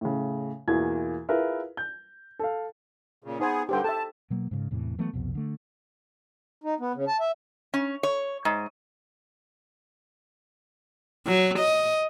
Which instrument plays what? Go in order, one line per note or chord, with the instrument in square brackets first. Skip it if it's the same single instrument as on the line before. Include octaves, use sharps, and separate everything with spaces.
[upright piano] A2 C#3
E2 B2 E3 A#3 F4 G#6
E4 F4 G#4 A#4 B4 E5
G6
A4 F5
[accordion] A#2 C#3
[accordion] B3 G#4 [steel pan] D#4 C5 G#5
[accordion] G2 D3 [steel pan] G4 C5 G5
[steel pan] A4 E5 [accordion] A5
[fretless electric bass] B2 F#3 A#3
G#2 C#3
E2 A2 C3 E3
E3 F#3 A3 B3
C2 F2 B2
D3 A3
[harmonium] D#4
B3
C#3
A5
E5
[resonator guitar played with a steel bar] C#4
C#5
G#2
[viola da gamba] F#3
D#5